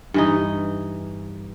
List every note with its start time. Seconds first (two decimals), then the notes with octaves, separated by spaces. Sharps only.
0.14 G2 E3 D#4